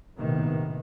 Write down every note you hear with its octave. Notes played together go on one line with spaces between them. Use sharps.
A#1 A2 C3 D#3 A#3 B3